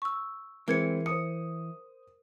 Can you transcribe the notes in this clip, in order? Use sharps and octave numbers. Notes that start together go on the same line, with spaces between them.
C#6 E6
E3 G#3 C4 A#4 B4 G#6 C#7
C5 D#6 C#7